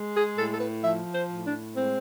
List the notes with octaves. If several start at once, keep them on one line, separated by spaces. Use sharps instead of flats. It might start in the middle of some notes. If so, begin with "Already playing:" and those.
Already playing: G#3
G#4
A2 A4
A4
B4
F3 E5
C5
A2
D4
G#3 C4